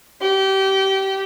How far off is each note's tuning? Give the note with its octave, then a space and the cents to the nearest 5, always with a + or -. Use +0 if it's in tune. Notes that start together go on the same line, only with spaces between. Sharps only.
G4 -25